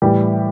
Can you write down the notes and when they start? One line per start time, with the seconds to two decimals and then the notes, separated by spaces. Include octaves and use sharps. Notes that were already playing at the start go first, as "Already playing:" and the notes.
0.02 A2 E3 G3 G4